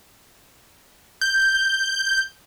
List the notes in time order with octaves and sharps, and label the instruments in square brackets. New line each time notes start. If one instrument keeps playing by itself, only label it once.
[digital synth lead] G6